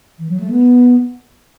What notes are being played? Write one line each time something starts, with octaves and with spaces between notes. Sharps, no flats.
E3
F#3
A3
B3